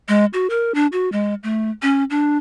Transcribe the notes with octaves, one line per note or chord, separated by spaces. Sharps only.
G#3
F#4
A#4
D4
F#4
G#3
A3
C#4
D4